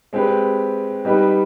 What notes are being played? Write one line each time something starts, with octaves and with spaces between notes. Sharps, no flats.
G#3 C4 G4 B4
G3 B3 D#4 G4 B4